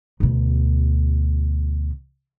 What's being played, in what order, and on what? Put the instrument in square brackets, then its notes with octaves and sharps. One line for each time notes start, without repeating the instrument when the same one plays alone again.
[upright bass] D2 B2